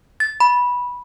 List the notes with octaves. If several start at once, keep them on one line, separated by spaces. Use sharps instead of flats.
A6
B5